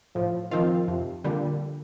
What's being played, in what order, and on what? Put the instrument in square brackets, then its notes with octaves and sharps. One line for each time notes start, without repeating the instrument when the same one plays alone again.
[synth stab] A2 [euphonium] F3
[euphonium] D#3 [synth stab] F3 C4 F4
[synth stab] F2 [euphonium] C3
[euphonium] A#2 [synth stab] D3 G3